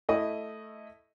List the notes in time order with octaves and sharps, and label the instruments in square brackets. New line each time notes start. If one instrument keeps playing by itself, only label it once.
[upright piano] A3 E4 D#5